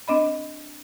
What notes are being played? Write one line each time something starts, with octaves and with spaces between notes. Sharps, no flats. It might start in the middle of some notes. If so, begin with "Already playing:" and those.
C4 D4 D#5 B5